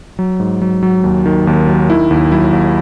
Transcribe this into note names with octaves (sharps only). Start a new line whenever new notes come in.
F#3
G#2
F#3
F#3
D#2
D#3
D#2
F#3
D#3 E4
D#2
F#3 E4
D#2